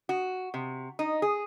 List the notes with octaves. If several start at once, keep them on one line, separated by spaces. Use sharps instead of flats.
F#4
C3
D#4
G#4